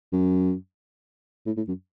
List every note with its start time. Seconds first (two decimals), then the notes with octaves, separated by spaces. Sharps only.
0.13 F#2
1.46 A2
1.57 A2
1.68 F#2